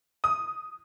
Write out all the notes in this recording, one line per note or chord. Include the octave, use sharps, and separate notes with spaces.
D#6